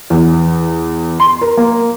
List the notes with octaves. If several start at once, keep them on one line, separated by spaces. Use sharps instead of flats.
E2
C6
A#4
A#3